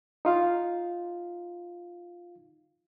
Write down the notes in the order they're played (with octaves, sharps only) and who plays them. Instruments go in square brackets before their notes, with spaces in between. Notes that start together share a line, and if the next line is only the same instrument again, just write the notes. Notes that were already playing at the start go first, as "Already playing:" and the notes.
[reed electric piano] D#4 F4 F5